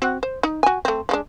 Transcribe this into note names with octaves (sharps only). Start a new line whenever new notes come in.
C4 F#4 F#5
C5
D#4
F#4 G#5
A3 C4
F3 G#3 D4